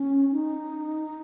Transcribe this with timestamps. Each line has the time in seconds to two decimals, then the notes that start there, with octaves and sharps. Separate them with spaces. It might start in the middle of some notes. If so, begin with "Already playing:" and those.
Already playing: C#4
0.32 D#4